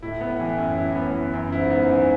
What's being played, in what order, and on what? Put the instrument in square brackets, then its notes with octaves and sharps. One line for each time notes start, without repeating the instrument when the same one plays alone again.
[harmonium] A2 [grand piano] E4
[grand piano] B3
E3
F#2
E4
B3
E3
F#2
[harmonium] G#2 [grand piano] E4
[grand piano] B3
E3